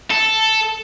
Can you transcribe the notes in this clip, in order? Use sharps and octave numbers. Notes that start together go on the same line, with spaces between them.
A4